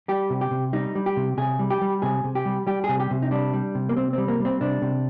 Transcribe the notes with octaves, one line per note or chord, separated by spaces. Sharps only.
G3 G4
C3
G4
C3
G3 D#4
G3
G4
C3
C3 G#4
G3
G4
G3
C3 G#4
C3
G4
G3
G3 G4
C3 G#4
G4
C3
D#4
G3 D4
G3
C3
A#3
C3 C4
G3 C4
A#3
G3 C4
C3 D4
C3